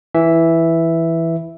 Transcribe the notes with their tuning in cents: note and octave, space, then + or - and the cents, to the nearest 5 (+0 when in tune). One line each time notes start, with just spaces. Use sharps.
E3 +0 E5 +0